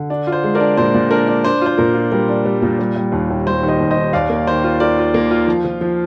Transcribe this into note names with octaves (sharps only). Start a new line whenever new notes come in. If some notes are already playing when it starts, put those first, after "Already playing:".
Already playing: D3
D4
F4
C5
G#3
A#4 D5
D4
A#2 C5
A#2
D4 A#4
D4
D4 C5
F4 C5
A#2 A#4
F4
G3 A#4
D4
G3
A#2
G3
G3
D#2
D#2
G3 C5
D#3
C5 D#5
D#2
C5 D#5
D#3
D#2 D5 F5
A#3
D#3 C5
F4
F4 A#4 D5
F4
A#3
F4
F3
F3
F3